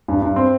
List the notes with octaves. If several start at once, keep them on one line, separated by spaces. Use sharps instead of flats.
G2
G2
C4